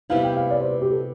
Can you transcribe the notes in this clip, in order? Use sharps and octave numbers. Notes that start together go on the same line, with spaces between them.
C3 G3 B3 E4 F5
G5
F5
D5
C5
B4
G4
A4